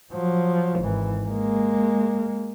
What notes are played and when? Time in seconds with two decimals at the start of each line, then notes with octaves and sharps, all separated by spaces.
0.13 F3 F#3
0.80 G#1 E3
1.27 G#3 A#3